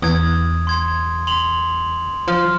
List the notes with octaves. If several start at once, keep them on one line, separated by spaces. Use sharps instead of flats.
E2 D#6 G#6
C6 G#6
C6 F7 F#7
F3 C6 F6